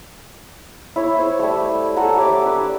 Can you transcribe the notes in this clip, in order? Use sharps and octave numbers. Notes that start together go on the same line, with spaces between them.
E4 C#5
C5 C#5
G3 A3
A4 F#5 G#5 A#5
G4 C#5 D5 D6
D4 B4